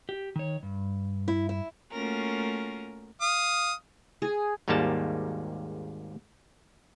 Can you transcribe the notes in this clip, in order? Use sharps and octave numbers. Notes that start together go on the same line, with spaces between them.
G4
D#3 C#5
G2
E4
E4
A3 A#3 C#4 F4 F#4 A#4
F5 D#6
G#4
G#1 D#2 G#2 G3 A#3 A5